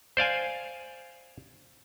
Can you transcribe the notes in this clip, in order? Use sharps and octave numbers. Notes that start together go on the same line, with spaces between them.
C5 D5 F5 G#5